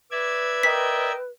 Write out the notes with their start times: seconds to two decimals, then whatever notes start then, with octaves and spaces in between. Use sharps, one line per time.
0.11 B4 D5 E5 G#6
0.63 A#4 D#5 G5 B6